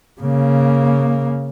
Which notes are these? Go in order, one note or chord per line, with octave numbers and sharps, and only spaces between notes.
C#3 A#3